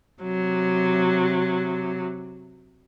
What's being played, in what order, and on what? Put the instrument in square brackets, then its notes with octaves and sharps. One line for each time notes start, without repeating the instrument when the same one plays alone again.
[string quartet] C3 F#3